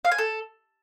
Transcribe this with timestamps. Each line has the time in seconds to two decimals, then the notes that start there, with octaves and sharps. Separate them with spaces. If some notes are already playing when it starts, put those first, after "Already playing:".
0.05 F5
0.11 G#5
0.18 A4